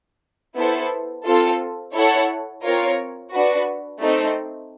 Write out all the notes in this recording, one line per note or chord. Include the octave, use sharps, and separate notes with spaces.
B3 E4 A4 C5
C4 F4 A4
E4 A4 C#5 F#5
C4 F4 A#4 C#5
D4 F#4 B4
A3 C4 D#4